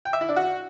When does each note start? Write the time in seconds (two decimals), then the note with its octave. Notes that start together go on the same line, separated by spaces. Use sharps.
0.05 G5
0.13 E5
0.21 E4
0.29 D4
0.36 F#4